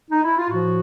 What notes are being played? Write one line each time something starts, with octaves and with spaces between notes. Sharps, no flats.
D#4
E4
F4
A2 F3 F#4